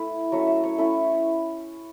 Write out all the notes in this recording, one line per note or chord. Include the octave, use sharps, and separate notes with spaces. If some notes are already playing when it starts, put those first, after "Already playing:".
Already playing: A3 E4 B4
F#3 A3 C#4 C#5
E5
C#5
A3 C#4 E4